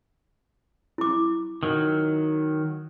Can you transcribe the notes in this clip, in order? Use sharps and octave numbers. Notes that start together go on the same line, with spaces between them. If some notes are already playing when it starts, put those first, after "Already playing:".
E4 D6
D#3 F#3